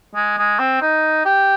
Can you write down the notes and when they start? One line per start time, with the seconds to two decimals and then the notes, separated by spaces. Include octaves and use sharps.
0.15 G#3
0.38 G#3
0.59 C4
0.81 D#4
1.25 G4